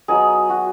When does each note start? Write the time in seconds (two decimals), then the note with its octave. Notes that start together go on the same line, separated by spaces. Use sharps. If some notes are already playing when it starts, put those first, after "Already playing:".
0.08 F#3 B3 D#4 G#4
0.49 F#4